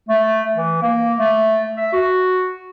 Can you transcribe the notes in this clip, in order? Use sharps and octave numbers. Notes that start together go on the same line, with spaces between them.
A3
E3
A#3
A3
E5
F#4